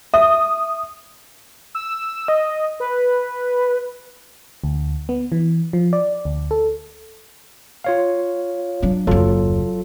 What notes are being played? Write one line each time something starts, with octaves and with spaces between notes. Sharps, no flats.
E5 D#6
E6
D#5
B4
D2
B3
E3
F3
D5
D2
A4
F4 C#5 F5
F#3 D4
F#1 D#2 F#3 F4 A4